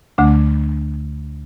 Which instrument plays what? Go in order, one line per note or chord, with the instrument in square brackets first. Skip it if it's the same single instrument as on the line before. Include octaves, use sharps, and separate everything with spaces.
[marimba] D2 D3 A3 D4